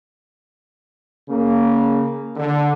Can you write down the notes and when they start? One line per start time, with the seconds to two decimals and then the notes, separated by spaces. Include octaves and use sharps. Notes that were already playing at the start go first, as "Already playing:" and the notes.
1.29 C#3 A#3
2.36 D3